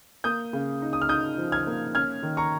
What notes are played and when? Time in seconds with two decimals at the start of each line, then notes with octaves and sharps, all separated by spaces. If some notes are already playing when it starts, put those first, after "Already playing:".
0.24 A#3 D#6 G6
0.53 C#3
0.82 D#4
0.93 D#6
1.02 F6
1.09 D#4 D#6 G6
1.38 F3
1.52 F6 G#6
1.67 A#3
1.95 C#4 F6 G#6
2.23 D#3
2.37 A#5 C#6